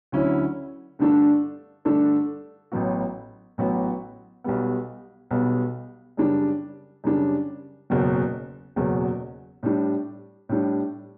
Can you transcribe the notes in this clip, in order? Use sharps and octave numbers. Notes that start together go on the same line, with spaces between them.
D2 D3 F#3 C#4 E4
G2 D3 A3 D4 A4
G2 D3 A3 D4 A4
A1 A2 F#3 B3 F#4
A1 A2 F#3 B3 F#4
B1 B2 G3 B3
B1 B2 G3 B3
F#2 C#3 G3 D4
F#2 C#3 G3 D4
F#1 E2 B2 F#3
F#1 E2 B2 F#3
A2 G3 D4
A2 G3 D4